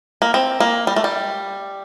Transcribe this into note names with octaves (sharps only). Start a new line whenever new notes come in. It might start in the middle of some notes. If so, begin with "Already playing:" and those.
A#3
C4
A#3
G3
A3
G3